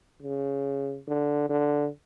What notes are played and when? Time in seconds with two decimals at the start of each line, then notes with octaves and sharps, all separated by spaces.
0.22 C#3
1.07 D3
1.49 D3